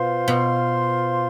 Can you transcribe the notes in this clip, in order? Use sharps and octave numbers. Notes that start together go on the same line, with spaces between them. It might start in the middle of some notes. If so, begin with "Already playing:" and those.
Already playing: B2 F4 C5 F5 C6
B2